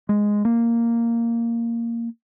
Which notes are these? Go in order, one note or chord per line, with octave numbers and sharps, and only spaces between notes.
G#3
A#3